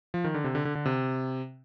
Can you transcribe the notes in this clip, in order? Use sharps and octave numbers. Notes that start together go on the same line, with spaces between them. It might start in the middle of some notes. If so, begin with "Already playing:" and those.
F3
D#3
D3
C3
D3
D3
D3
C3